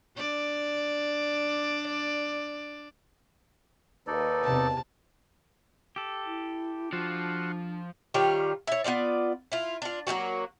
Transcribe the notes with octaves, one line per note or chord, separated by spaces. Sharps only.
D4 D5
D#2 D#4 A4 B4 D5
E2 C3 A5
G4 A4
E4
F3 D4 F4 F#4
D#3 G3 F4 C#5
E4 C#5
B3 E4 F4 D5
E4 F4
D4 F4
F#3 G3 A#3 F#4